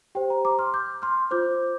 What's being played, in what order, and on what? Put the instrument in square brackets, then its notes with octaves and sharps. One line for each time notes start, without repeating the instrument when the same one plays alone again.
[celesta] G4 C5 G5
A#5
A#5 D6
C6 F6
D6 G6
C6 F6
F4 C5 D6 G6